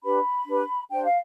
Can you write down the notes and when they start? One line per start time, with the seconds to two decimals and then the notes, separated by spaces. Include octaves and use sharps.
0.04 D4 G4 B4 B5
0.47 D4 G4 B4
0.90 D4 G4 C5 G5
1.04 F5